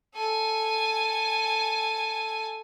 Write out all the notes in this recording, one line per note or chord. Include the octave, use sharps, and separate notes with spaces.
A4 G#5